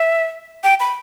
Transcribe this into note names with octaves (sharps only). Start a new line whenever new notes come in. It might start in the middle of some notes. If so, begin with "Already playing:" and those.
Already playing: E5
G5
B5